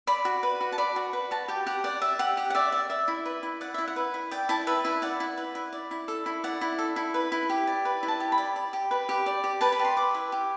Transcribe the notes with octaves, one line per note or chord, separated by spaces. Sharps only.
D5 B5
F#4
B4
F#4
A5
D5 B5
F#4
B4
F#4 A5
G4 G5
G4 F#5
D5 F#5
D5 E5
G4 F#5
G4
F#5
D5 E5
D5
D5 E5
E4
B4
E4
D5 F#5
E4 E5
F#5
B4
E4
D5 G5
E4 A5
B4 E5
E4 E5
D5 F#5
E4
B4
E4
D5
E4
A4
E4
D5 F#5
E4
A4
E4
B4
E4
G4
D5
B4
E4
A5
G4
B5
D5
D5
G4
B4
G4
D5
G4
B4 A5
B5
G4
C6
B4 D6
E4
G4